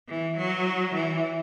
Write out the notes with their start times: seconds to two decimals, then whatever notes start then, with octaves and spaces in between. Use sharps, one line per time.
0.08 E3
0.37 F#3
0.94 E3